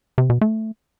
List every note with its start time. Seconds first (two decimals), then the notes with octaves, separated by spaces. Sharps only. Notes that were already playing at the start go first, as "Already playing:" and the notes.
0.18 C3
0.30 B2
0.41 A3